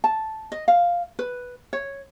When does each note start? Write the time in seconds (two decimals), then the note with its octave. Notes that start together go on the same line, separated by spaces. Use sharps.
0.04 A5
0.52 D#5
0.68 F5
1.19 B4
1.73 C#5